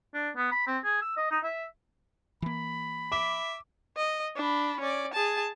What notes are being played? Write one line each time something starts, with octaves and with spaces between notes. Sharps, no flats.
D4
B3
B5
C4
G#4
E6
D#5
D#4
E5
E3 A#3 B5
E5 D6
D#5
D4 B5
C#4 D5
G#4 A5